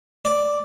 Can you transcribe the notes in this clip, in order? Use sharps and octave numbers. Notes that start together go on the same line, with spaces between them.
D5